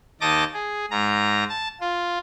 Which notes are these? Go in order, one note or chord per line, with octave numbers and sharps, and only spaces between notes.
D#2 D#4 D#5 A5 D6 A#6
G#4
G#2 A#5
A5
F4